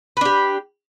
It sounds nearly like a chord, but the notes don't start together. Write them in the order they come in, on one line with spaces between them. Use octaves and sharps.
B4 D4 G4